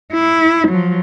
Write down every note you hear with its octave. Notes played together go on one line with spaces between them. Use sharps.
E4
F3 F#3